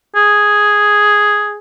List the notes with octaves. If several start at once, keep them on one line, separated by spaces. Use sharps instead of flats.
G#4